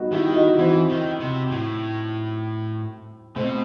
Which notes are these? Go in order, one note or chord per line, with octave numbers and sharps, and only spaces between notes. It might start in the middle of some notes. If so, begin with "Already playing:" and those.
Already playing: G3 B3 D#4 F#4
D#3 E4 G4
D#4 F#4
F#4
E3 C4 E4
D#3
C3
A2
B2 A3 C4